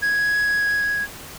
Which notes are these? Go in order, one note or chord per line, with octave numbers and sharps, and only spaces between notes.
G#6